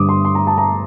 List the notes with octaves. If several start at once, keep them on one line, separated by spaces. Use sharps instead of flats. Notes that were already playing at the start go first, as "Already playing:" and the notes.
Already playing: G2 D3 G3 D6 D#6
C6
C6
A#5
A5
A#5